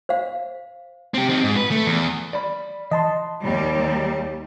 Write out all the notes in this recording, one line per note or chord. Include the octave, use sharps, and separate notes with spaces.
C5 F5
C4 G4
C4 D#4
G#2
B4
A3
E2
D5 B5
E3 D#5 A5 C6
D#2 G3